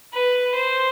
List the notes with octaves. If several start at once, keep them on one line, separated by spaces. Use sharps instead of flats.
B4
C5